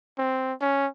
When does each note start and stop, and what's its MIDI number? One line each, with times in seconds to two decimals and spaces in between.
0.18 0.53 60
0.61 0.87 61